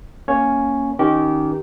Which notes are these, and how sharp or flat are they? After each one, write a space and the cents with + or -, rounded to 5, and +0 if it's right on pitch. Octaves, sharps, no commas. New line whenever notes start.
A#3 +0 C#4 +0 C#5 +0
D#3 +0 C#4 +0 G4 -20